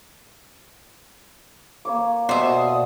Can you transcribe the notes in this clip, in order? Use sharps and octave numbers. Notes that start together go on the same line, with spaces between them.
A#3 C#5 D6
B2 C5 D5 E5 D#6